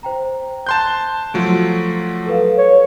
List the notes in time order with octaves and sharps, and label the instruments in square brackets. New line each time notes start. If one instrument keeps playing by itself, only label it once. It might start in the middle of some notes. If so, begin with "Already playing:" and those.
[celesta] C5 G5 A#5
[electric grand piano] A5 C6 G6 [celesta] F#6
[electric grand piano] F3 F#3 A3 [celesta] D7
[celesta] A4 B4 F5
[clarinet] C#5